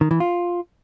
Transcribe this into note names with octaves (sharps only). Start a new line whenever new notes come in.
D#3
E3
F4